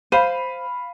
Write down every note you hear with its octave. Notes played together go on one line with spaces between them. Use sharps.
C5 F5 B5 D#7